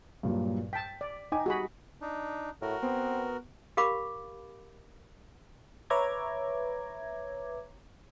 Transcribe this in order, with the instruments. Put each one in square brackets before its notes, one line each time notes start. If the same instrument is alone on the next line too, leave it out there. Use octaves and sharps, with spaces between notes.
[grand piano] G2 A#2 F#3
[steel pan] G5 A5 [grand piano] B6
[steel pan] D5
[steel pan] D#4 [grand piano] G5 G#5 D6
[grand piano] G3 [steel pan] F#4 G#4 B5
[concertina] D4 D#4
[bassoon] A2 [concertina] F#4 A#4
[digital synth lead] B3 [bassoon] C4
[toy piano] G4 A#4 F5 B5 D6
[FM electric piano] B4 C#5 E5 A#5 D6 G#6